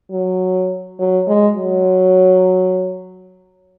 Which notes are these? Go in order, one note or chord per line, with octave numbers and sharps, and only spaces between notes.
F#3
F#3
G#3
F#3